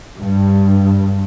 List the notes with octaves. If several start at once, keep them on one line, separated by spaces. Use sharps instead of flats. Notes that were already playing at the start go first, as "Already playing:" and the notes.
G2